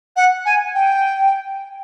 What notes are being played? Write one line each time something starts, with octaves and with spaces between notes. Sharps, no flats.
F#5
G#5
G5